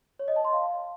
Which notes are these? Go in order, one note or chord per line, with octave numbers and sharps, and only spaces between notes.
C#5
D#5
A5
C6
F5